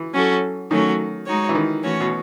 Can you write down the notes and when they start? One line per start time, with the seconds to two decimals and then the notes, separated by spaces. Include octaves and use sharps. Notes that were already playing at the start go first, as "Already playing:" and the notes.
Already playing: E3
0.14 F#3 C#4 F#4 A4
0.70 D#3 F#3 A3 C#4 F#4
1.26 G#3 D#4 F#4 C#5
1.49 E3
1.55 D#3
1.83 E3 A3 C#4 F#4 C#5
2.00 B2